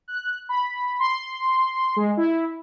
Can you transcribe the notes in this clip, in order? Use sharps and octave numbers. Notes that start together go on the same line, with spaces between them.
F#6
B5
C6
G#3
E4